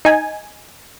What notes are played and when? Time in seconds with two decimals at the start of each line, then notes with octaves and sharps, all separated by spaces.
0.05 D#4 G#5